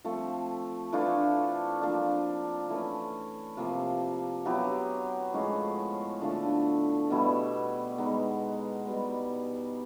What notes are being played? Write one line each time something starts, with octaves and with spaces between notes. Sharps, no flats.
F3 A3 C4
E3 A3 D4 F4
F3 A#3 D4
E3 A3 C#4
C3 F3 A#3
F#3 B3 E4 G4
A2 F3 G#3 C#4
D3 F3 A3
B2 G3 B3 E4
G#3 B3 D#4
B2 G3 B3